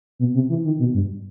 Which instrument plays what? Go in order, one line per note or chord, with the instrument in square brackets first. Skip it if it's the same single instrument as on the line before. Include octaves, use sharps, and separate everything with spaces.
[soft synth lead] B2
C3
E3
D#3
B2
G2